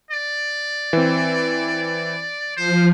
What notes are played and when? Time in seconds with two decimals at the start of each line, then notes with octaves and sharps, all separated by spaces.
0.11 D5
0.93 E3 C4
2.56 F3 C5